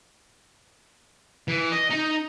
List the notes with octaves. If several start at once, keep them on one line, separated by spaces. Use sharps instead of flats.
E3
D#5
D#4